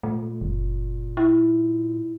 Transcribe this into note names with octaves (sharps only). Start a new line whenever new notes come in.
A#2 A3
F#1
E4